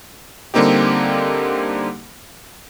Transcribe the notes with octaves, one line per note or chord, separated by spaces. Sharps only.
D3 G3 A#3 C4 D#4 G4